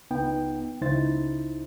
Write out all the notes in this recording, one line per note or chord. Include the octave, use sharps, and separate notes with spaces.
C#2 B3 D#4 G5
C#2 C#3 D#4 E4 C5 A6